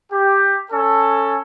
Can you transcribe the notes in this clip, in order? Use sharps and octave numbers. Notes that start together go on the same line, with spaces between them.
G4
C#4 A4